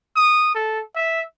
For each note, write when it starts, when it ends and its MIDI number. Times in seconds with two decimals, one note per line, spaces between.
0.16 0.54 87
0.55 0.81 69
0.96 1.22 76